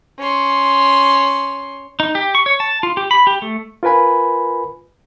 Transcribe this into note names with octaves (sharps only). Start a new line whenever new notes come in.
C#4 C6
D#4
G4
C#6
C#5
A5
F4
G4
B5
G4
A3
F4 A#4 B4 G#5 B5